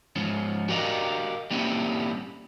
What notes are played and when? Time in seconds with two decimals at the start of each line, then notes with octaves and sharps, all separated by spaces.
0.16 G#2 F3 C#4
0.69 F#4 G4 A#4 D5 D#5 F5
1.51 G3 A#3 C4 C#4 E4 G4